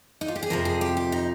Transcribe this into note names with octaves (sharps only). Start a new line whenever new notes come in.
D#4
F4
G4
G#4
F2 C3 F3 A#4
G#4
G4
G4
D#4